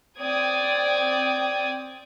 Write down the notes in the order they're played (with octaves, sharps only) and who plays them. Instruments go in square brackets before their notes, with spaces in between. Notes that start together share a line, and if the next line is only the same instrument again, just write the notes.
[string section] C4 D5 G5 D#6 G#6